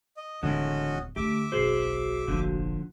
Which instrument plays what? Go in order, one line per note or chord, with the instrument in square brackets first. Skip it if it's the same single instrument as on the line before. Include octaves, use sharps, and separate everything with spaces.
[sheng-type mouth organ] D#5
[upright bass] D1 C#2 [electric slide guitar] D3 E3 G#3 [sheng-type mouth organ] C#4 F#4 D#5
[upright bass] D2 D3 [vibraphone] A3 [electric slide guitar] G4 [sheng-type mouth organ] E5 D6
[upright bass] F#1 B1 [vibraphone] F#4 [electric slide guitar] G#4 C5
[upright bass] F1 A#1 [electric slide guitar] A#2 D3 F3